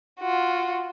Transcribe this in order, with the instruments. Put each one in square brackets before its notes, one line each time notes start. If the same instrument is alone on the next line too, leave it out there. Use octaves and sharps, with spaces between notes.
[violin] F4 F#4